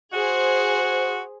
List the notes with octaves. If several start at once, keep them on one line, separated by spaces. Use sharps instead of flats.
F#4 G#4 C5